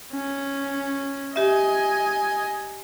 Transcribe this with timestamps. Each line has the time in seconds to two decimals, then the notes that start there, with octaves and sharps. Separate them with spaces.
0.13 C#4
1.36 G4 D#5 E5 G#5